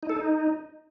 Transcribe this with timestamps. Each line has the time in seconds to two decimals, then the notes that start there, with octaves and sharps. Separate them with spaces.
0.03 D#4
0.09 A4
0.16 D#4